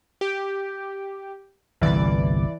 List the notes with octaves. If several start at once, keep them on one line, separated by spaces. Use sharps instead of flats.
G4
G1 C2 E3 D5